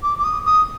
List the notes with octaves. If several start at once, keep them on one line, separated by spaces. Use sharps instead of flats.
D6
D6
D#6
D#6